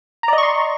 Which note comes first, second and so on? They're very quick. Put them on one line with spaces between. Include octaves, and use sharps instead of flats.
A#5 D5 D#5 C#6 C6